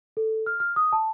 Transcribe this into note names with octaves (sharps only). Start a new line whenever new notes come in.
A4
F6
F6
D#6
A5